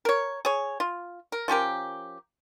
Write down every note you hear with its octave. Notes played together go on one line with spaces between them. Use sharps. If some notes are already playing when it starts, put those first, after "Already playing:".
A#4 C#5
G#4 C#5
F4
A#4
F3 C#4 G4 A#4